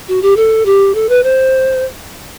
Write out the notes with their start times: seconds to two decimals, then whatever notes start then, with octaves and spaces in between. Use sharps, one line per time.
0.08 F#4
0.22 G4
0.37 A4
0.66 G4
0.95 A4
1.09 B4
1.24 C5